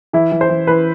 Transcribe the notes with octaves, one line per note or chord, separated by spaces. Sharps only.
E3 E4
E3
C5
E3
E3 B4